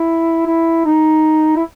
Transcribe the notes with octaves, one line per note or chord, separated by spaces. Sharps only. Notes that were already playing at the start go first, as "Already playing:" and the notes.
Already playing: E4
E4
D#4
E4